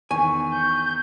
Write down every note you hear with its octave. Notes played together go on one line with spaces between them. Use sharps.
E2 D#3 G#5 C#6
G6